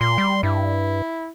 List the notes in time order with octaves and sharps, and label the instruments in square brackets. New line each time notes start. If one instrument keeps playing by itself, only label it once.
[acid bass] A#2 [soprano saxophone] C6
[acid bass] G3
[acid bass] G2 [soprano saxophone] E4